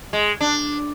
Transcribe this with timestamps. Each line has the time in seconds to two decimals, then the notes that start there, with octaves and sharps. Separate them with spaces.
0.13 G#3
0.41 D4